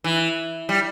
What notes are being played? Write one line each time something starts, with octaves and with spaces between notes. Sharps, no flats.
E3
G3